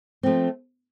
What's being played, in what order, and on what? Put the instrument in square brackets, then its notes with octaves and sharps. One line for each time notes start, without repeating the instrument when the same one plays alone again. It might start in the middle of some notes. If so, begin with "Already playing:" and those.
[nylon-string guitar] F3 A3 C4